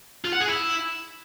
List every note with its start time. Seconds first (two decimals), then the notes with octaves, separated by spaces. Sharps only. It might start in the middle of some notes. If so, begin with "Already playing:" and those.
0.25 F4
0.33 F#5
0.40 G#4
0.48 E4